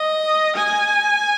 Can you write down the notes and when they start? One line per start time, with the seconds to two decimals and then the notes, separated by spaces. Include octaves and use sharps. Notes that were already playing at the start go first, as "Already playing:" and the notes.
Already playing: D#5
0.57 G#5